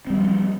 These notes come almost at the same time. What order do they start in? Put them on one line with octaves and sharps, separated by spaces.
C4 G3 B3 F3